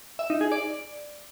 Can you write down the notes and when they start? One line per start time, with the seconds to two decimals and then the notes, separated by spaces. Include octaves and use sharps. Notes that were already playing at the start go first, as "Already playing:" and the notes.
0.19 E5
0.30 D#4
0.41 G#4
0.52 D5